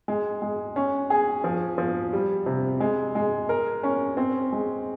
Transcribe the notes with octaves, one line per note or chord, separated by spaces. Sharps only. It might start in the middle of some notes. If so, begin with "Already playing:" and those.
G#3
G#3
C#4
G#4
F3
F3
G3
C3
G#3
G#3
A#4
C#4
C4
G#3